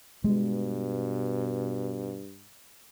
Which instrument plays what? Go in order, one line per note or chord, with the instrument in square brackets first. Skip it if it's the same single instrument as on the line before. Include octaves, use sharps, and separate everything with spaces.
[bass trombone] G2 [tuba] B2 [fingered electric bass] G#3